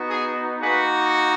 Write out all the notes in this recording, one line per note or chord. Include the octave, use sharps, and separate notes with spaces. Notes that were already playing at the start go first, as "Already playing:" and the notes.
Already playing: B3 D#4 F#4
G#4
A#3 D#4 F#4 G#4 B4